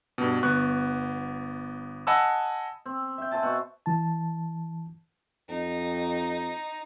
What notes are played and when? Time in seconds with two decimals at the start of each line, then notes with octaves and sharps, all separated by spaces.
0.18 G2 B2
0.43 G1 B3 C#6 F#6
2.07 D#5 F#5 G#5 A5 B5 E6
2.86 C4
3.18 E5 G5
3.31 C5 E5 G#5 A5
3.43 B2 F#5 C#6
3.86 E3 A5
5.49 F2 D#4